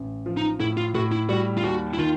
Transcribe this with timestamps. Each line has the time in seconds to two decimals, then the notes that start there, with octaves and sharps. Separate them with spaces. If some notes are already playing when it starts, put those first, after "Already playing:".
Already playing: A1
0.26 F3
0.37 D#4
0.60 A2 E4
0.77 F4
0.95 A2 F#4
1.12 E4
1.29 G3 F#4
1.57 F4
1.63 D#2 F#4
1.94 E4
1.98 D#3 F4